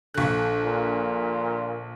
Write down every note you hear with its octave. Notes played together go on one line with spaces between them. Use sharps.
A#1 D3 F#4 F#6
A#2